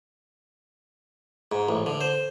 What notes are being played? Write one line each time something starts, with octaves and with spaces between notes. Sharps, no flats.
G#2
A1
D3
C5